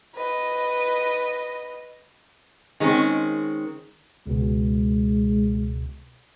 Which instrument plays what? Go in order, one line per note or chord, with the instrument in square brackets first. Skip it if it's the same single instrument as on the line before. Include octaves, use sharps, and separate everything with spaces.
[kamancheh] B4 D#5
[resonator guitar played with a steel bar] D#3 G#3 C4 C#4
[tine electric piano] C#2 B2 [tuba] G#3